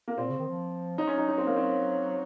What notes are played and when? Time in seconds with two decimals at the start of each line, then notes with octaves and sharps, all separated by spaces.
0.08 A#3
0.18 A#2 C4
0.28 C#3
0.38 D#3
0.48 F3
0.98 F#3 D#4
1.07 C#4
1.18 D#4
1.28 D#4
1.38 C4
1.47 A#3
1.56 C4